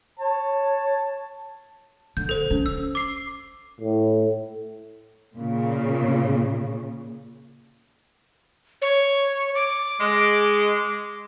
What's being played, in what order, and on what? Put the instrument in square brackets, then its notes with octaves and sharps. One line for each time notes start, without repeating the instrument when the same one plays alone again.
[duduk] C#5 [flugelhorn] A5
[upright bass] D3 [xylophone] G6
[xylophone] A4 C5
[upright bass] C#4
[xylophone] E6
D6 C7
[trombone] A2
[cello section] A#2 C#3
[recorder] C#5
D6
[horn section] G#3